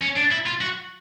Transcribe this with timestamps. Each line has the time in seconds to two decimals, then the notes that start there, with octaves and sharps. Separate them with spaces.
0.02 C#4
0.17 D4
0.32 E4
0.47 F4
0.61 F#4